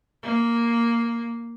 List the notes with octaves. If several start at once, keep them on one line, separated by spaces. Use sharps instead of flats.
A#3